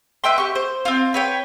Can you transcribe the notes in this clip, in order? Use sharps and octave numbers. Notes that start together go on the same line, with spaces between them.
B4 E5 G5 C6
G4 C#6
C5
C4 F4
B4 C#5 G5